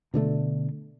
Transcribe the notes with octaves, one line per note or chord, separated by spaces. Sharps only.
B2 D3 A3 D4